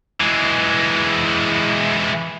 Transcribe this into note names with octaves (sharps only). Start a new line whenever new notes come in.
E3 G#3